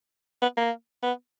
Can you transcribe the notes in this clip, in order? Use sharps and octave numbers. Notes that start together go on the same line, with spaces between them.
B3
A#3
B3